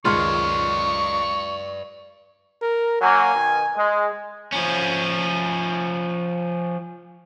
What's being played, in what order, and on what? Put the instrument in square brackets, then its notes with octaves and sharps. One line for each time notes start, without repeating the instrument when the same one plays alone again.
[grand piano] C#2 D#3 G#3 [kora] F4 C#5 [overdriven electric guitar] B4 D5 [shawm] C#6
[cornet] A#4
[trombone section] F#3 A#3 [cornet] G#5
[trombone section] B2 D#3
G#3
[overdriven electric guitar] F3 C#4